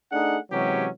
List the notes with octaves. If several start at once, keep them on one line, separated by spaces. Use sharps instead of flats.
A3 D4 D#4 G#4 F#5
C3 E3 F#3 G#3 C#4 G4